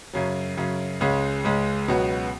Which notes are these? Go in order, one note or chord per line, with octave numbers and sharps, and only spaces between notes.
F#2 C#3 F#3
F#2 C#3 F#3
C#2 C#3 G#3
C#2 C#3 G#3
C#2 B2 F#3 B3 F#4